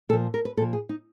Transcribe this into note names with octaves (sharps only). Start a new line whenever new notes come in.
A#2 F3 A4
A#4
B4
A#2 F3 A4
G#4
D#4